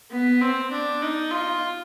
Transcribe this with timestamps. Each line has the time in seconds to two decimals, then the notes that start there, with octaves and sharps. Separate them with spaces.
0.11 B3
0.41 C4
0.72 D4
1.02 D#4
1.31 F4